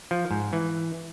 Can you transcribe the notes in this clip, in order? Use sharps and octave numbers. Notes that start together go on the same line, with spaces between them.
F3
G#2
E3